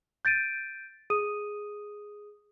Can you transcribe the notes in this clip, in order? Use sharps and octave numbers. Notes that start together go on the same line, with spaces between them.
G6 A6 D7 D#7
G#4 D#6 D#7